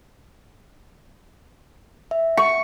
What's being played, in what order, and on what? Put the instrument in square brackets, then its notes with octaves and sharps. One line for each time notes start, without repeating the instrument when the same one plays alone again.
[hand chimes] E5
[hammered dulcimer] C#6